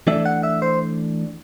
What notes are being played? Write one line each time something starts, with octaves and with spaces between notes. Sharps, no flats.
E3 A3 D4 E5
F#5
E5
C5